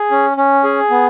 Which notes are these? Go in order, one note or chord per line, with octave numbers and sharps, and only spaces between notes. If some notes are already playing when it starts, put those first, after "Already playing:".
Already playing: G#4
C#4
C#4
G#4
B3